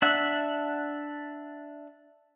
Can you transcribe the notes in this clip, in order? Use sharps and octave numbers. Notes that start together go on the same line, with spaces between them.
D4 E5 F#5